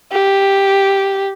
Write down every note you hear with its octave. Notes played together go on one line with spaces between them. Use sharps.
G4